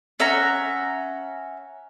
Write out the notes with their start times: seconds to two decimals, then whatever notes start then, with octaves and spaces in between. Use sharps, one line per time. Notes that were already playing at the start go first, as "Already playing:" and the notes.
0.20 C#4 E5 F#5 A#5